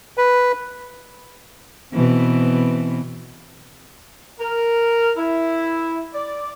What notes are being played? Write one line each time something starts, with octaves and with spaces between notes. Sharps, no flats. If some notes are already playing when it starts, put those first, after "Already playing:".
B4
B2 E3 C4
A#4
E4
D5